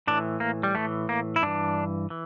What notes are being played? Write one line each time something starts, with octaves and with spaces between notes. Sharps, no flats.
A2 E3 D4
A#3
G3
A2 E3 A3
A#3
E4
G2 E3 D4
E3